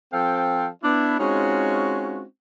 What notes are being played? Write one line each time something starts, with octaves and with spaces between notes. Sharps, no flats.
F3 C4 A4 F5 G5
B3 D4 E4
G#3 C4 C#4 D#4 F4 F#4